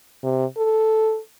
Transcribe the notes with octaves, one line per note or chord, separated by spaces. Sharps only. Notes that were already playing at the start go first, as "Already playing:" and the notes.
C3
A4